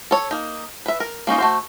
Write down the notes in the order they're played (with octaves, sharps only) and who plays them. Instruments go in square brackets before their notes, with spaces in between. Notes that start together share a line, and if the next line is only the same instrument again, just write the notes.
[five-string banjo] A4 C#5
A#3 D#4
B4 E5
A#4
A#3 C#4 D#4 F4
A3 F#4 C5